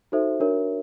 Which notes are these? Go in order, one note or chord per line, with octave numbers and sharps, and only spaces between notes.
D#4 F#4 A4 C5 E5
D4 F#4 A#4 C#5 E5